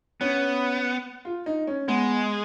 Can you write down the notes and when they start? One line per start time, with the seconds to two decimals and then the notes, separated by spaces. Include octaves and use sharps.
0.21 B3 C#4
1.25 F4
1.46 D#4
1.67 C#4
1.88 G#3 B3